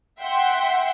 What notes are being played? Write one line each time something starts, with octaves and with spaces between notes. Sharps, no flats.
E5 F#5 G5 C6